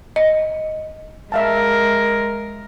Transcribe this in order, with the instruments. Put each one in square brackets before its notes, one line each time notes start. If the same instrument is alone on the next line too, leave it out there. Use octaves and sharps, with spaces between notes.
[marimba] D#5
[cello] G#3 A#4 [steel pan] E5 F5 A5